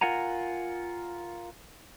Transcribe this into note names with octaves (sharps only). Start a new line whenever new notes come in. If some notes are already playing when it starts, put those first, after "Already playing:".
F4 A#4 F#5 G#5 A#5